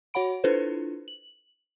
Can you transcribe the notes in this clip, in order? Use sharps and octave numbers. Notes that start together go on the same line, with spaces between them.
F#4 C#5 F#5 B5 D7
D4 E4 F4 A4 B4 C5
F#7